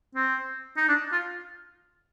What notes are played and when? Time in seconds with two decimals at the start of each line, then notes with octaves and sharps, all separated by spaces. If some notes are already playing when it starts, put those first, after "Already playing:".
0.15 C4
0.77 D#4
0.89 D4
1.12 F4